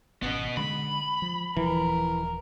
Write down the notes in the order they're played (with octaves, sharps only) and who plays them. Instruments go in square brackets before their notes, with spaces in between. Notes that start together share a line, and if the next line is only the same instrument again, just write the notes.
[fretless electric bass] G#1 C#4 [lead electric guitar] B2 B3
[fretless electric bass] D3 G#3 [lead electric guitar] B5
[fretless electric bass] F3
[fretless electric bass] D#1 F3 [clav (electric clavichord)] E3 [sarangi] A#4